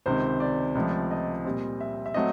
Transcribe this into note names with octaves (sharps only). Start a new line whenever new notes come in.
C#2 C3 D#3 C5
D5
C#2 C3 F3 A3
D#5
A#2 G3 C4
E5
E5
F#3 A3 C4 D#5